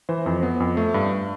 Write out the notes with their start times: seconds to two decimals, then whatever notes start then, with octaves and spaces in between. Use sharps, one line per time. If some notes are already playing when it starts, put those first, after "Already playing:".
0.09 E3 C5
0.26 F2
0.43 B3
0.60 F2
0.77 A3
0.94 G2